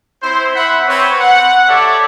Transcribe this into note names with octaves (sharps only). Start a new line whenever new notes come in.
C4 E4 C5
E5 F#5 B5
C4 B4 C#5
F#5
G4 A4 C#5 D5 E5